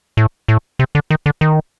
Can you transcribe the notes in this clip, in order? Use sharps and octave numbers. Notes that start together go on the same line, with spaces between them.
A2
A2
C3
D3
D#3
D3
D#3